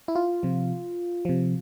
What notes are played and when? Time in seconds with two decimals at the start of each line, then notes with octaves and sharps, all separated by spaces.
0.08 E4
0.15 F4
0.43 C3 F3
1.25 C3 F3